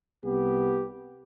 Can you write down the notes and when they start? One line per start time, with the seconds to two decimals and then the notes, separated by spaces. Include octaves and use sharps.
0.23 C2 B3 G4